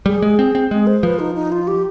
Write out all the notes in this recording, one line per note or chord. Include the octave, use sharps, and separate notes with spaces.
G3 G#4
G#3
C4
C4
G#3 G#4
C5
F3 B4
D#4
D#4
F4
G4